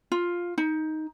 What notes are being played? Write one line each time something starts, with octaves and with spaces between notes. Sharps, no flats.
F4
D#4